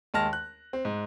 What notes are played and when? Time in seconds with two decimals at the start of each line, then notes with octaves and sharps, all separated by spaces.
0.14 D#2 G#3 A5 F6 A#6
0.33 F#6
0.73 C4
0.85 G#2